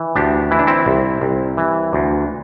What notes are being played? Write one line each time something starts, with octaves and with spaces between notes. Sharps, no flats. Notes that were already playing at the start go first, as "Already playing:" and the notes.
Already playing: E3
D2 D4 G4
E3 E4
D4
C4 E4
C2
C2
E3
D2